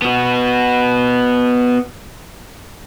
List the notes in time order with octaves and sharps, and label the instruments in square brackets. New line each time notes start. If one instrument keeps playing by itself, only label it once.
[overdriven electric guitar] B3 F#4